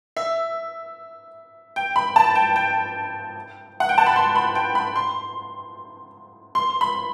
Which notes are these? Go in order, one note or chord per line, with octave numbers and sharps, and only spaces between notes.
E5
G5
B5
A5
G5
G5
F#5
G5
A5
B5
C6
B5
G5
B5
C6
C6
B5